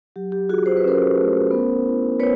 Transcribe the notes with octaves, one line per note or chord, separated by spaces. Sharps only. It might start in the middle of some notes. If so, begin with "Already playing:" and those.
F#3 G4
G4
F4 F#4 G#4
C5
B4
C#4 A#4 C5
A3
B3
E4
B3 B4 C#5